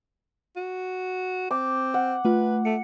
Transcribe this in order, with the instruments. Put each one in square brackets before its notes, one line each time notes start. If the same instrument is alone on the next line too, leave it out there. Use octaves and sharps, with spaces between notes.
[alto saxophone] F#4
[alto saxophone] C4 [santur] D6
[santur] F#5
[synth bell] A3 F4 [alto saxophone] B4
[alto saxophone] A3 [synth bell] C#7